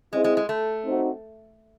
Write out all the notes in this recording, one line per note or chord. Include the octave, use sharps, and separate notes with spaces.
G#3 C4 E4 G#4 D#5
G#3
G#3
A3
C4 D#4 F#4 C5